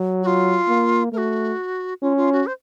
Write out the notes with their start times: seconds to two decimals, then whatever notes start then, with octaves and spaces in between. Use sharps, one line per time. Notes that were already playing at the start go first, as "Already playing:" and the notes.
Already playing: F#3
0.23 F#4
0.27 F4
0.68 A#3
1.12 A3 A#4
1.18 F#4
2.02 C#4 F4
2.17 F4
2.33 F#4
2.47 C5